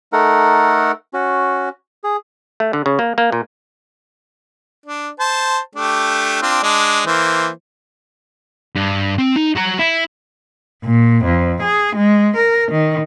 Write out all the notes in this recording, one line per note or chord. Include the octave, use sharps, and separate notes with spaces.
A3 D#4 A4 A#4 F#5
C#4 F#4
G#4
A3
D3
C#3
A#3
A#3
A#2
D4
C5 A5
A3 D4 G4
C4 D4 F4
G#3 D4
E3 A#3 C5
G2
C4
D#4
F#4 A#5
E4
A#2
F2
G#4
G#3
A#4
D#3